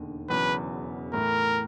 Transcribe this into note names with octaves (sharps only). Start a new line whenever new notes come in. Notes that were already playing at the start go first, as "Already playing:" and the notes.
Already playing: E1 D#2 D3
E1 E2 C#3 F#3 B3 B4
A2 E3 A3 A#4